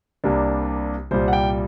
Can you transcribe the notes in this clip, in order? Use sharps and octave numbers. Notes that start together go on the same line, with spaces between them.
C2 C3 G3 A#3 D4
C2 A#2 G3 C5
F#5
G5